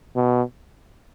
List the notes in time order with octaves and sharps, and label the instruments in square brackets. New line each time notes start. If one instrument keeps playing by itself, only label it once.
[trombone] B2